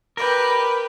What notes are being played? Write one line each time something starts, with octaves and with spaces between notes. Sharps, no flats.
G4 A#4 B4 D5 G5